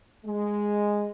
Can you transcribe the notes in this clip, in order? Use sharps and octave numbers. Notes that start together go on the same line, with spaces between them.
G#3